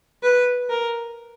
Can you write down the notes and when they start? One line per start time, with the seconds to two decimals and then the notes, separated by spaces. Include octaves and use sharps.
0.23 B4
0.70 A#4